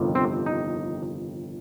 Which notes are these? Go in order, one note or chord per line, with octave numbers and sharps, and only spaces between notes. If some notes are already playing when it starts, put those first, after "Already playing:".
Already playing: G1 F2 C3 D#3 G3
C4
D#4